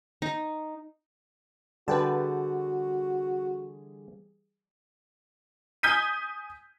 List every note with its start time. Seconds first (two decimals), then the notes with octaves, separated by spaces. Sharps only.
0.22 D#4
1.88 D3 E3 G3 F#4 G#4 B4 G5 A5
5.83 G#5 D#6 G6 G#6 B6 D#7